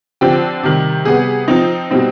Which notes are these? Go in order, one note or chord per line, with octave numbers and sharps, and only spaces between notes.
D3 F3 C4 G4
C3 D#3 G3
C3 G3 B3 G#4
F3 C4 D#4
B2 G3 C4 D#4